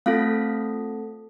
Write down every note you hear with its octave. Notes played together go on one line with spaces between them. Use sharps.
A3 C4 F4 A4 F5